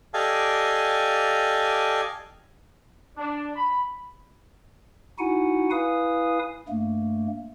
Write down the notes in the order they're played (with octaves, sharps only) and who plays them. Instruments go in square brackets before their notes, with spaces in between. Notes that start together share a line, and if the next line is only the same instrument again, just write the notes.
[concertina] G4 A4 D5 D#5 F5 G#5
[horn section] D4
B5
[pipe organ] D#4 E4 F#4 F#5 G#5
E4 B4 F5 G#5 D#6
G2 A3 A#3